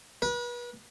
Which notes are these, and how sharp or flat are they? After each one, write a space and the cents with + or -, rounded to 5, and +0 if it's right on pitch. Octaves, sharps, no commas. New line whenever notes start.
B4 -35